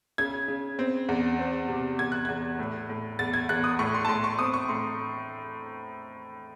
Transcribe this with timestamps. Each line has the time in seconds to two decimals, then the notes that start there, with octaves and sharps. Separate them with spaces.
0.18 C#3 G#6
0.48 C#3
0.79 C4
1.09 E2
1.39 C4
1.68 C3
1.99 E2 G#6
2.12 F#6
2.25 E2 G#6
2.59 A2
2.89 A2
3.19 E2 A6
3.34 G#6
3.49 E2 F#6
3.64 D#6
3.79 A2 C#6
3.94 C6
4.05 A5
4.08 A2 C6
4.24 C#6
4.39 C4 D#6
4.54 C#6
4.69 A2 C6